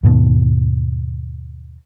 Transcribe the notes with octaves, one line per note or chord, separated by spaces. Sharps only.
D#2 G#2 B2 D#3